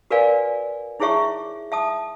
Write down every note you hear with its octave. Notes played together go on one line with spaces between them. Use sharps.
F#4 A#4 B4 D5 F5 G#5
D#4 E4 G#4 C#5 E5 C#6
E5 A5 D#6